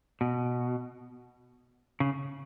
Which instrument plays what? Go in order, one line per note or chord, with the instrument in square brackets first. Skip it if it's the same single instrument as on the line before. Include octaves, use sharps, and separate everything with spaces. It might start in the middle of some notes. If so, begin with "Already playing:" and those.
[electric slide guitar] B2
C#3